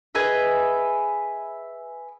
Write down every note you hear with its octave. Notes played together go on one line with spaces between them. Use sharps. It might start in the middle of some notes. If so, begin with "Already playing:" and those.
G#4 B4 D#5 E5